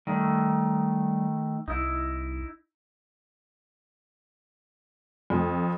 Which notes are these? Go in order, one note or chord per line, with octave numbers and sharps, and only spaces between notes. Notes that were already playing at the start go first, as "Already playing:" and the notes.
D#3 G3 A3
C2 D#4 E4
F2